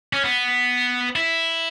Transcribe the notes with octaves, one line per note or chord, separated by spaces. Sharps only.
C#4
B3
E4